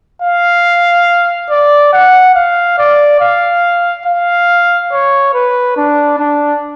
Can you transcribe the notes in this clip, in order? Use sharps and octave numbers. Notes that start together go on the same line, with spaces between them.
F5
D5
F#5
F5
D5
F5
F5
C#5
B4
D4
D4